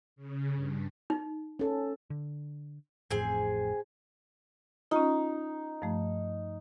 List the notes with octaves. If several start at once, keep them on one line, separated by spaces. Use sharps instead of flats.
C#3
G2
D#4
C#4 A4
D3
A1 F2 A2 C4 G#4 G#5
C#4 D#4 F4
G2 F3 A3